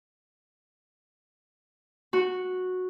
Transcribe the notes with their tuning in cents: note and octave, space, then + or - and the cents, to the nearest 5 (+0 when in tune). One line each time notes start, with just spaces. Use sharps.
F#4 -10